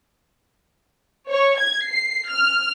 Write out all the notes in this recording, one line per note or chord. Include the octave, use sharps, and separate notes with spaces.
C#5
G#6
C7
F6